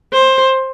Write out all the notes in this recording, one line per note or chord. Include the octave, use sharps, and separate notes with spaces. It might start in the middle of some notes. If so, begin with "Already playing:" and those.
C5